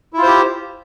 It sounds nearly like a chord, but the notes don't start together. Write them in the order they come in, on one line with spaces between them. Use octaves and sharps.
E4 F4 C5 G4